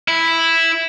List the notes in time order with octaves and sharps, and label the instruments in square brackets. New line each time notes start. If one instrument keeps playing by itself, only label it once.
[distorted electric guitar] E4